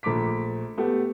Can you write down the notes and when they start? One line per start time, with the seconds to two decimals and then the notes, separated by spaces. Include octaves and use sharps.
0.03 A#1 A3 A#5 D6 B6
0.78 A3 B3 G4